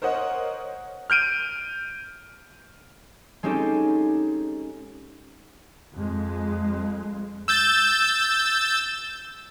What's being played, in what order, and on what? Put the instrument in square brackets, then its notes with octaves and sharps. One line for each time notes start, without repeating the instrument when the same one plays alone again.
[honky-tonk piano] A#4 C5 C#5 D#5 F#5
[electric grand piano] F6 G6 D7 D#7
[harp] G#3 C4 C#4 D#4 G4 A4
[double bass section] F2 G#3
[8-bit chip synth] E6 G6 A6